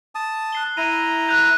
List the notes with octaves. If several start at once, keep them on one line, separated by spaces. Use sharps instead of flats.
A5 D#6
F#6 C7 G7
E4 A#5 C7 D#7
F#6 G6 F7